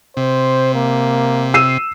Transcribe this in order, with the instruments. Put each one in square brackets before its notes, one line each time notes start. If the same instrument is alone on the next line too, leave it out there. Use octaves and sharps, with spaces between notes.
[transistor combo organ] C3 [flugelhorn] C5
[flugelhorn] A#3
[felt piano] E6 C7 D#7